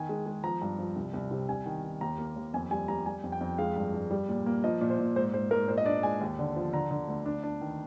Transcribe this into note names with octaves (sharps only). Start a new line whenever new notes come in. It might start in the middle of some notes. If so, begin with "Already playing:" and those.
Already playing: D#3 G#5
G#3
G#3
F3 A#5
G2
F3
C2
C2
C3
C2 G#5
D#3
D#3
D#2 A#5
A#3
D#2
F2 G#5
G3 G#5
G3 A#5
G3 G#5
F2
G5
F2
G#3 F5
G2
G2
G3
A#2
A#3
F3 D#5
A#2
C5
A#2
G#2 C5
G#2 C5
G#2 A#4
A#2 C5
D#5
D4 D5
G#3 G#5
D#2
D3
F3
D3 A#5
D3
D2
D4
D4
D#3